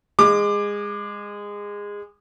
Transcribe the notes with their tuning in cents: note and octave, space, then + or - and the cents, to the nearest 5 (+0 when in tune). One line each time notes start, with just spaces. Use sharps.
G#3 -20 D6 +20